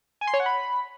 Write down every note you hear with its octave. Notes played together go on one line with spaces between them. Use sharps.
G#5
C6
C#5
F#5
B5